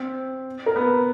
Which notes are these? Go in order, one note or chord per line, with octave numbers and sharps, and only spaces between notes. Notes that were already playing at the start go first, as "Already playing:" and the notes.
Already playing: C4 C5
A#4
B3 B4